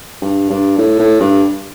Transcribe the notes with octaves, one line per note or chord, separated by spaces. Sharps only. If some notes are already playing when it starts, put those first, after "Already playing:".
G2
G2
A2
A2
G2